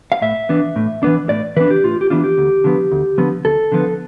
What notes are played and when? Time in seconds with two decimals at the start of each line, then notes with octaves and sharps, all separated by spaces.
0.12 F5
0.22 A2 E5
0.49 E3 B3 D4
0.76 A2
1.03 E3 B3 D4
1.29 A2 D5
1.57 E3 B3 D4 B4
1.70 G4
1.84 A2 F4
2.01 G4
2.10 E3 B3 D4 F4
2.24 G4
2.38 D2
2.64 D3 F3 B3
2.92 D2
3.18 D3 F3 B3
3.45 D2 A4
3.72 D3 F3 B3